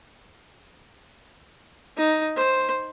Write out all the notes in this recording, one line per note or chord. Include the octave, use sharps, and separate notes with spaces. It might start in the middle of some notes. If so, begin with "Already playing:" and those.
D#4
C5